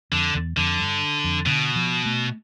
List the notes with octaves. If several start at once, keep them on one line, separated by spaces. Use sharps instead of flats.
F2 D3
E2
F2 D3
G2
F2
B2 D3
F3
A3